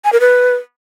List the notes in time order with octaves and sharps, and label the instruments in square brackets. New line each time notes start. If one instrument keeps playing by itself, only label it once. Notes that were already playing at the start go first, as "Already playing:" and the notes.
[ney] G#5
A#4
B4